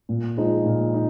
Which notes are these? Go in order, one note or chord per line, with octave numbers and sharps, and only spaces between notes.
A#2
F3 G#3 D#4
A#2
D#4